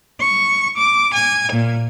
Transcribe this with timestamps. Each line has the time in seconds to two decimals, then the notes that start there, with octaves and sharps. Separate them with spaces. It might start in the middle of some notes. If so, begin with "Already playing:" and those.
0.19 C#6
0.76 D6
1.14 G#5
1.51 A#2